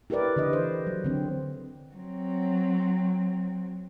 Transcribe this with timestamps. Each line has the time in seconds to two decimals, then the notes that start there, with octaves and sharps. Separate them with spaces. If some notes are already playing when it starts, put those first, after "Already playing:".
0.10 E4 G4 A#4 B4 D5
0.36 D3 E3 B4 D#5
0.53 C5
0.87 F#3
1.04 D3 C4
1.95 F#3 C4